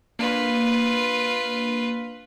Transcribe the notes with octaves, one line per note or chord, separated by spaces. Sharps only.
A#3 D4 F4 B4